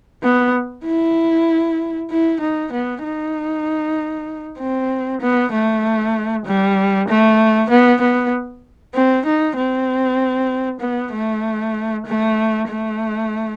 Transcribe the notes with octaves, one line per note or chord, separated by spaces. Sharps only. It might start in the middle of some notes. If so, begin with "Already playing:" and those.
B3
E4
E4
D#4
B3
D#4
C4
B3
A3
G3
A3
B3
B3
C4
D#4
C4
B3
A3
A3
A3